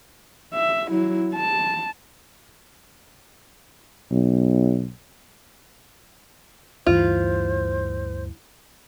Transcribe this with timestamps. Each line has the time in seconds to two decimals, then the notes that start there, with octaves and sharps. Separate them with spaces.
0.54 E5
0.90 F#3 E4
1.35 A5
4.11 B1
6.86 D2 G2 E3 F4 C5